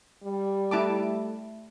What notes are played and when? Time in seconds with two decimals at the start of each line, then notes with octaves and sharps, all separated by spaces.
0.24 G3
0.71 A3 E4 A5 D6